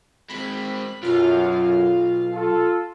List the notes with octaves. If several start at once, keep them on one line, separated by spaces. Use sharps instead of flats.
G#3 C4 B5
B1 F#2 F4 F5
F4 A4